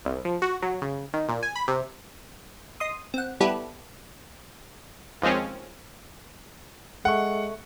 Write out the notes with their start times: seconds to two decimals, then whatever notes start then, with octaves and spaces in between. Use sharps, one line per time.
0.05 C2
0.25 F3
0.42 F#4
0.62 F#3
0.82 C#3
1.14 D#3
1.29 A#2
1.43 G#5
1.56 B5
1.68 C3
2.80 D#5 C6 D#6
3.14 C4 F#5
3.40 G3 B3 E4 G4 A4 B4
5.22 D#2 F3 G#3 C4 C#4
7.05 G#3 A4 E5 F#5 C#6